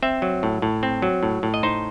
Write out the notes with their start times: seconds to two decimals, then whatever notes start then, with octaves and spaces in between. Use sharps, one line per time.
0.03 C4 E5
0.22 F#3
0.43 A2
0.62 A2
0.83 C4
1.02 F#3
1.23 A2
1.43 A2
1.54 D#5
1.63 D#4 C5